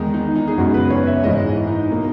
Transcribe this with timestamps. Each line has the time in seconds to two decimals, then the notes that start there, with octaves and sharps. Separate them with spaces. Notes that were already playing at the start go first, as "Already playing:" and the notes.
Already playing: E2 D#3 G#3 D#4
0.14 D#4
0.36 D#4
0.48 G#4
0.58 F#2 C#3 G#3 B3 F#4
0.74 B4
0.90 C#5
1.07 E5
1.23 G#2 E3 G#3 D#5
1.45 E4
1.67 D#4
1.89 B2 A#3